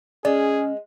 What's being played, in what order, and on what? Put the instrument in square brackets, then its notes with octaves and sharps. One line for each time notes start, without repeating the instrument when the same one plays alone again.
[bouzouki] G#3 [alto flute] C#4 [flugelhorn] G#4 [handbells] D5